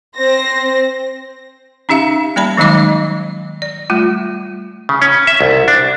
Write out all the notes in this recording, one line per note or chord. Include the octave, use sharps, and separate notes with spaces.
C4 C5 A#6
C#4 D#4 G4 E5 F5
G3 A#3 D5 A5 B5
D#3 F#3 G#3 D#4 D#5 D6
D5
G3 A3 F4
C#3
C#4
E5
C2
D4